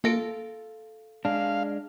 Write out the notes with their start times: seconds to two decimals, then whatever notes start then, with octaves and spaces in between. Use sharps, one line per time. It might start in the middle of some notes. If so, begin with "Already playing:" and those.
0.04 A#3 F4 A4 A#6 D7
1.25 G#3 D4 F5